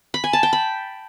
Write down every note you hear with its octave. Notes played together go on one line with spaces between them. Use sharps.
B5
G#5
A5
G5
B5